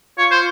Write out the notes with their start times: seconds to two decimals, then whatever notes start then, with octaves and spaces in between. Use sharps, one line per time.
0.18 F4 C#5
0.31 C5